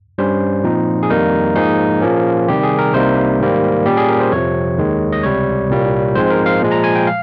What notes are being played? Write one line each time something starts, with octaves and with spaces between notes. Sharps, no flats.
G2 G3 C#4 C5
A#2 F3 C4 D#4
G#4
F2 D#3 G3 A#3 D#4 A#4
G#2 F3 A#3 D#4 G#4
A#2 F3 A#3 C#4
C3 D#3 G3 G4
G#4
A#4
C2 C3 G3 A#3 D#4 C5
G#2 D#3 G3 A#3
A#2 G3 C#4 G4
G#4
A#4
C5
F2 C3 F3 C#5
D#2 D#3 G#3
D#5
C#2 C3 G3 C#5
C2 A#2 G3 A#3
G#2 F3 G#3 C4 C5
A#4
F5
A#2 F3 G#3
A#5
G#5
G5
F5